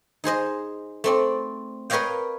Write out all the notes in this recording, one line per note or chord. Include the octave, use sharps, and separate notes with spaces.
D#4 G#4 C5 D#5
A3 C4 D5
A#4 B4 C#5 D#5 F5 G5